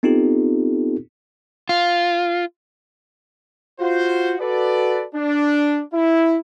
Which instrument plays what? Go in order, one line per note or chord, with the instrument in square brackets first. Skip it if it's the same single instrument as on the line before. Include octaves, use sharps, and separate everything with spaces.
[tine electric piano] B3 C4 D#4 F4 G4 A4
[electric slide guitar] F4
[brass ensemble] F4 F#4 C5
F#4 A4 B4 D5
D4
E4